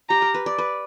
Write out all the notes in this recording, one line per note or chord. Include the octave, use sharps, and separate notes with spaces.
G4 A#5
A#4
B4
D5
B4